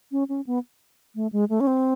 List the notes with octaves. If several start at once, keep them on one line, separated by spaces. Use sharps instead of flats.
C#4
C#4
B3
A3
G#3
A3
C#4
C4